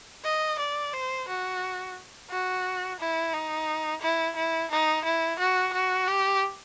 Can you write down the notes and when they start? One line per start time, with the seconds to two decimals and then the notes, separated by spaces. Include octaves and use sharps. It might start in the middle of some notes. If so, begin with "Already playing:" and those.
0.24 D#5
0.59 D5
0.93 C5
1.28 F#4
2.31 F#4
3.00 E4
3.33 D#4
4.01 E4
4.36 E4
4.71 D#4
5.05 E4
5.40 F#4
5.73 F#4
6.08 G4